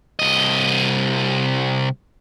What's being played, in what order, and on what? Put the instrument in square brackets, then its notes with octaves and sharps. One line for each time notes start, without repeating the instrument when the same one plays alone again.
[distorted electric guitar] C2 D#5